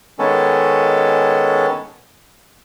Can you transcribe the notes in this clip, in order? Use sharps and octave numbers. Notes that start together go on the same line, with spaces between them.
D#3 G#3 B3 C#4 A4